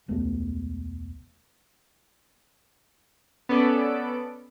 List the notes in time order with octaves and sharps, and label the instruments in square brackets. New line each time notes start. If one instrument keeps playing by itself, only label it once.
[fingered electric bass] E1 C#2 A3 B3
[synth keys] B3 C#4 A4 D5 B5 D7